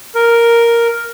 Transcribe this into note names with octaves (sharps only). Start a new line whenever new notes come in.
A#4